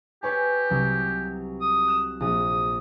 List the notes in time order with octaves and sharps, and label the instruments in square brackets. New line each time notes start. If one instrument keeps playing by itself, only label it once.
[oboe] G4 [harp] B4 C#5 G#5
[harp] C2 F#3
[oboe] D#6
[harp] F#6 E7
[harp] A#1 [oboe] D#6